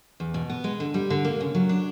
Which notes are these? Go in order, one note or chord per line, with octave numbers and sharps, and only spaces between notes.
E2
B2
B3
G#3
D3
G3
D3
A#3
C#3
F#3
D4